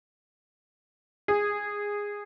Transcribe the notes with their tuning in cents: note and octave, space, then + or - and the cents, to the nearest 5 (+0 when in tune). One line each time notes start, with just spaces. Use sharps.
G#4 -10